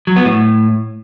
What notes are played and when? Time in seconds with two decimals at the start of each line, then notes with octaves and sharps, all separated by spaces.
0.07 F#3
0.16 B3
0.25 A2